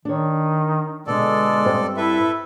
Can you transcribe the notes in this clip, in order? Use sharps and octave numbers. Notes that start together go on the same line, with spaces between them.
D#3 D4 C#5
B2 D3 G#3 B3 A4 D5
G2 C4 C5
E4 A4 B4 E5